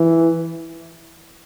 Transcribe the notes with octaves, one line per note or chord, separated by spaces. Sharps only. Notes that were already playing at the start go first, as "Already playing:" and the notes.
Already playing: E3